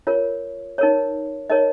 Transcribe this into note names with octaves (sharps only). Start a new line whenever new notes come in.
F4 A#4 C#5
D#4 A#4 C#5
D#4 A#4 C#5 D#5